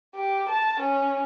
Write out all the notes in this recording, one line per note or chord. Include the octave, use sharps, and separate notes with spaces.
G4
A5
C#4